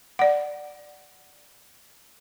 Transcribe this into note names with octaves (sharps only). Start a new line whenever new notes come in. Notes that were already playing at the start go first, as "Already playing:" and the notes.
D5 F#5